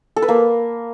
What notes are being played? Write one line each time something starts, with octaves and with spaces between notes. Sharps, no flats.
A4
B4
A#3